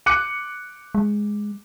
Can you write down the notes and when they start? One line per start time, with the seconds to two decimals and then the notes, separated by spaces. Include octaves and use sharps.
0.06 D6 F#6 C#7
0.95 G#3